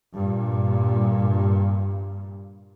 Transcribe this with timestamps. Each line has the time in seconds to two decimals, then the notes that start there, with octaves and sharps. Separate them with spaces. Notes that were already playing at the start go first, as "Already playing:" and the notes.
0.14 G2 A#2